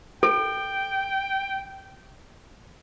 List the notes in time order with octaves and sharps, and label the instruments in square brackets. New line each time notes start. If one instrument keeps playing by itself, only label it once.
[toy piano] A4 [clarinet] G5